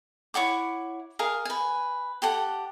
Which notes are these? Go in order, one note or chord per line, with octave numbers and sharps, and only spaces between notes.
E4 C#5 F#5 D6
G#4 A#4 F5
B4 G#5
G4 A4 F#5